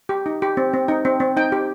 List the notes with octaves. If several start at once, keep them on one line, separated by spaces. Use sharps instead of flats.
G4
D#4
G4
C4
C4
D#4
C4
C4
D#4 G5
G4